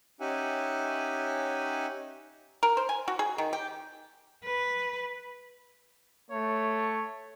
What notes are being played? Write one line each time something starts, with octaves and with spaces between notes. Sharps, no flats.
C#4 D#4 G4 E5 F#5 G#5
A#4
C5
G#5
F#4
G#4
D#3
G4
B4
A3 C#5